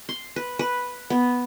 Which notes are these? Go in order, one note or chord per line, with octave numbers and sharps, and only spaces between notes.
C6
B4
B4
B3